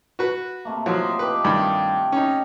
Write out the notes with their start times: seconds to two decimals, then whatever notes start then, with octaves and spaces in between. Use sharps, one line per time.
0.19 F#4 B4
0.65 C3 A3 A#3
0.86 F3 F#3 F4 D#5 C6
1.19 G4 B4 E5 F5
1.45 G2 D#3 B5
2.12 C#4 D#4